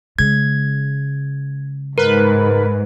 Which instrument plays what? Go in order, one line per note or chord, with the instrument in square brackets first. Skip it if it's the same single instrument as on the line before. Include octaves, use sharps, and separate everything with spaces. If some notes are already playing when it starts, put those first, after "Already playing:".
[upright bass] C#3 G#3 [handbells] G#6
[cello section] G#2 [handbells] A#4 [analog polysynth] B4